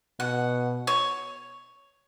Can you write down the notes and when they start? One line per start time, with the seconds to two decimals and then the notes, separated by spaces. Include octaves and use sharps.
0.20 B2 F#5
0.87 C#5